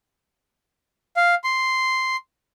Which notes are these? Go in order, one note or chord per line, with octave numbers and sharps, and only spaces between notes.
F5
C6